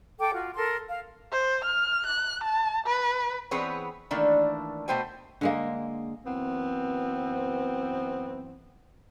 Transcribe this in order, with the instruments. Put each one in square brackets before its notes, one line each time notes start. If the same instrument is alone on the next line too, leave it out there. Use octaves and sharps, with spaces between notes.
[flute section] A4 G5 D6
F4 F#4
A4 A#4 C6
F5
[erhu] C5
F6
F#6
A5
B4
[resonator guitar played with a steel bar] E3 B3 C4 G#4 B4 C#5
D#3 E3 A3 A#3 D4
B2 A3 B3 C5 G5 G#5
[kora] D3 G#3 A#3
[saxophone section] F#2 E3 B3 C4